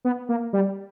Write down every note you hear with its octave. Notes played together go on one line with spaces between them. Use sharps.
B3
A#3
G3